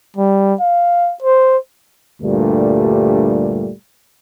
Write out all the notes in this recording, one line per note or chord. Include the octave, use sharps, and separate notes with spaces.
G3
F5
C5
D2 G2 A#2 G3 A3